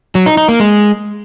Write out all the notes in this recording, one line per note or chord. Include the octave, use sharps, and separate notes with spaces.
F#3
D#4
D#4
A#3
G#3